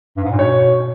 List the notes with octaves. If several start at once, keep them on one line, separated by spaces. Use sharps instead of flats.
G2
G#2
A#2
B2 C#5